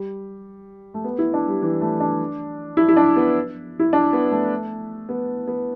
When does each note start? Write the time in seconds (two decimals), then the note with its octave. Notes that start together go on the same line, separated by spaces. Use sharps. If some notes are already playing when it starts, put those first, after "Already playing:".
Already playing: G3
0.94 A3
1.04 B3
1.19 E4
1.34 D4
1.48 G3
1.62 E3
1.81 A3
2.00 D4
2.77 E4
2.89 E4
2.97 D4
3.16 B3
3.79 E4
3.93 D4
4.13 B3
4.31 A3
5.09 B3
5.47 B3